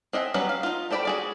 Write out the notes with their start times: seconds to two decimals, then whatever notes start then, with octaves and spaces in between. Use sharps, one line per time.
0.13 C4 D#5 E5 F#5 G#5
0.34 F#3 G3 B3 C#4 B4
0.49 F5
0.63 D#4 F4
0.91 A3 C5 D5 G5 B5
1.05 F#4 G#4 D5